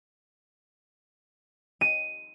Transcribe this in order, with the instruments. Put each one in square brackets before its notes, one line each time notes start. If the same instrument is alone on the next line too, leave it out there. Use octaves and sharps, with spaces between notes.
[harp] D#7